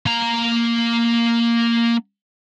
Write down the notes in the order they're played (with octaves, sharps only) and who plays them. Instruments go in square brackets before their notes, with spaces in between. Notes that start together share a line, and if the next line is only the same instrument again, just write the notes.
[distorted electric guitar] A#3 A#5